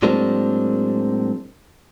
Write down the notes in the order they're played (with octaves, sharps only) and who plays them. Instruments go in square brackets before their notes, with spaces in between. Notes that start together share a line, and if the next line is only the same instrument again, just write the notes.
[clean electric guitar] A2 F#3 G#3 A#3 C4 D4